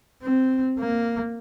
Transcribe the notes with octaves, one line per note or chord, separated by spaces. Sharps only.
C4
A#3